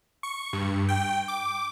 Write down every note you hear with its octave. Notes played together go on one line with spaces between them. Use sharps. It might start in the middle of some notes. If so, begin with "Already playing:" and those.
C#6
G2
G5
D6